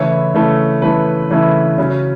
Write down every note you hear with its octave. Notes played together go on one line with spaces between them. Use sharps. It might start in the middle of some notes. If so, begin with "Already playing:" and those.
Already playing: C#3 E3 A3 E4 C#5
C#3 E3 A3 E4
C#3 E3 A3 E4 B4
C#3 E3 A3 E4
C#3 F#3 C#4